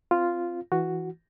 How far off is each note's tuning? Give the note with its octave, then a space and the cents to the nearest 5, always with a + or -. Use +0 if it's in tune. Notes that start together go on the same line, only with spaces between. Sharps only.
C4 +0 F4 -5
E3 +0 F#4 +0